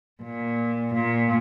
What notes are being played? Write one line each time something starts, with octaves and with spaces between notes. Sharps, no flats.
A#2
A#2